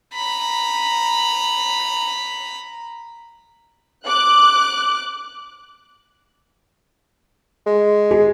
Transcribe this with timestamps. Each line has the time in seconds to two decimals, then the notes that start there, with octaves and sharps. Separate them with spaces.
0.15 A#5 B5
4.07 D6 F#6
7.66 G#3
8.11 G#4